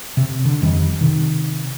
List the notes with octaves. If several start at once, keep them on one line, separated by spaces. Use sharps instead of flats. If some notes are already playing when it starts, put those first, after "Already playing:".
C3
D3
F2 D#3 F3 G3
C3 D#3